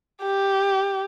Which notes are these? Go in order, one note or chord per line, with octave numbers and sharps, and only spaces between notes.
G4